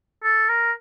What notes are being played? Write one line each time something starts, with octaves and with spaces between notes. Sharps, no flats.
A4
A#4